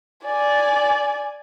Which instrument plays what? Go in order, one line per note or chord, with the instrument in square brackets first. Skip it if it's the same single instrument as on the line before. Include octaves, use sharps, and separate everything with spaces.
[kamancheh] D5 G#5